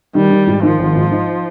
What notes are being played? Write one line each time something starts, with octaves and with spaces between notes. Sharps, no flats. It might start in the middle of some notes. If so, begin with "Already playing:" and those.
D#3 G3
D#3
G#2
D#3 F3
G#1
G#2
D#4